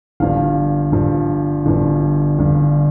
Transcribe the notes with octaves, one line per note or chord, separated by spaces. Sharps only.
G1 G2 F3 F5
G1 G2 F3
G1 G2 F3
G1 G2 F3